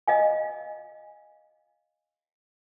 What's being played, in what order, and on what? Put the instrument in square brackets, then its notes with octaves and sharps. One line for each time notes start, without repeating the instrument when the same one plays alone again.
[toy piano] D#5 F5 G#5